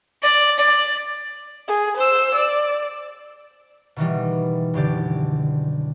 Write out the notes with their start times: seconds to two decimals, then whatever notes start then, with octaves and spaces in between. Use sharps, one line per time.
0.23 D5
0.59 D5
1.68 G#4
1.97 C5 E6
2.35 D5
3.96 B2 D#3 E3 G3
4.74 F#1 D3 G4 D5